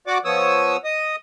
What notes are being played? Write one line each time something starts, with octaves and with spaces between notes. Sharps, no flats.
F#4 D5 F#5 D6
F3 B3 C#5 D#6 E6
D#5 D#6